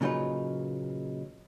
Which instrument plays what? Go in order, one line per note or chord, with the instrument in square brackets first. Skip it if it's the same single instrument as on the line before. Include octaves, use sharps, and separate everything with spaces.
[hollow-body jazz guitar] A#2 C#3 F#3 D#4 F4 B4